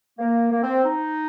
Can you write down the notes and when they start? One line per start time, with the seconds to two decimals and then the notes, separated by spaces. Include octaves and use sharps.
0.19 A#3
0.52 A#3
0.63 C4
0.85 D#4